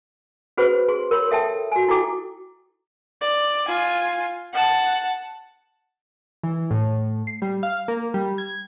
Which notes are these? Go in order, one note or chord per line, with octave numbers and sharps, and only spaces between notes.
C#4 F#4 G#4 B4 C5 B5
G#4 C6
A#4 C#5 B5 C6
A4 E5 G5 A5
F#4 G#5
D#4 E4 F#4 A4 G5 D6
D5
F4 G#5
F#5 A5
E3
A2
C7
G3
F5
A#3
G3
G#6